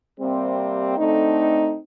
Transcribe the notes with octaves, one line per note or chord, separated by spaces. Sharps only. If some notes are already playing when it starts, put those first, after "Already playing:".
C3 G3 A#3 C4
D3 A3 C4 D#4